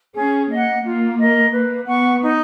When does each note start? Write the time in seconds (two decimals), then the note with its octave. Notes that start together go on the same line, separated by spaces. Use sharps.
0.16 C#4 G#4
0.50 A#3 D#5 F#5
0.85 A#3 F4
1.19 A#4 D#5
1.53 A#3 B4
1.87 B3 F#5 C#6
2.22 D#4